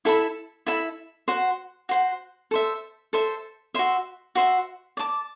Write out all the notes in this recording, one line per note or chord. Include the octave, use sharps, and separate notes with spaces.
E4 A4 E5 B5
E4 A4 E5 B5
F#4 C5 F#5
F#4 C5 F#5
A4 C5 E5
A4 C5 E5
F#4 C5 E5
F#4 C5 E5
D5 A5 D6